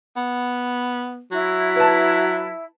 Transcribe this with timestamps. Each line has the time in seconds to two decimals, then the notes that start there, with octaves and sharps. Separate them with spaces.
0.16 B3
1.31 F#3 E4
1.76 B4 A5